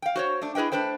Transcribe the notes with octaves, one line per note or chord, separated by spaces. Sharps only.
F5 G5
F#4 C5 C#5
A3 D4
E4 G#4 B4 D#5 G5
A3 D4 B4 C5 G5